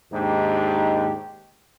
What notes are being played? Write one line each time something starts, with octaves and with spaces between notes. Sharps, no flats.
D#2 G#2 D4 D#4 G4